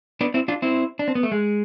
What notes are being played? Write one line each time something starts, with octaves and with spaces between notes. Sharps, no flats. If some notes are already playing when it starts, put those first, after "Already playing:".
B3 D4
C4 E4
D4 F4
C4 E4
D4
C4
B3
A3
G#3